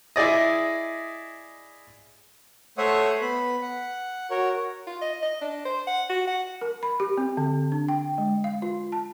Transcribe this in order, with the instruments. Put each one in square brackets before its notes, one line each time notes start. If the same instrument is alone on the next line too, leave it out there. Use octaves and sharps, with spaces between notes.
[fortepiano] E4 G#4 D5 D#5
[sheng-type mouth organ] A3 C5 C#5 E5 F#5 D#6
B3 B5
F#5
F#4 A#4 C#5
[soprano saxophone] F4
D#5
D#5
D4
C5
F#5
F#4
F#5
[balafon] A#4
B5
G4
C4
D3
D4
G5
G#3
F5
F4
A5